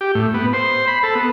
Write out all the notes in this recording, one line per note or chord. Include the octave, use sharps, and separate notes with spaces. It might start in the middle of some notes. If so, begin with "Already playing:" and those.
G4
A2
B3
C5
B5
A4
B3